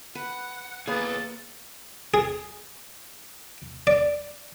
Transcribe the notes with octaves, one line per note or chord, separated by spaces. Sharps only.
B4 F#5
A#3 B3 G#4 B4 C#5 G#5 A6
G#4
D5